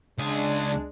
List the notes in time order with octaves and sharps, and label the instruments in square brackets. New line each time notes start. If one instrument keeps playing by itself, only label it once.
[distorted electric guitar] C#2 G#4 [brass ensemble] G#3 D4